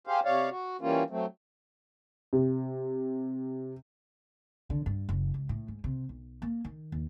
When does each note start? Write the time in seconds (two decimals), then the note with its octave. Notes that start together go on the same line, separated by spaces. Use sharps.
0.07 G4 G#4 C5 F5
0.25 C3 C#5 D5 F5
0.50 F#4
0.81 E3 G3 A#3 C#4 F4
1.10 F#3 A3 C4
2.33 C3
4.70 D3
4.86 G2
5.09 F#1
5.34 C#2
5.49 A2
5.68 G#2
5.84 C3
6.09 B1
6.42 A#3
6.65 D#3
6.92 D#2